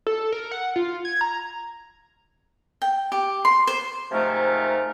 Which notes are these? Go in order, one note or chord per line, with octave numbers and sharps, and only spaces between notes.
A4
A#4
F#5
F4
G#6
A#5
G5
G4
C6
C5
G#2 C3 F3 A3 A#4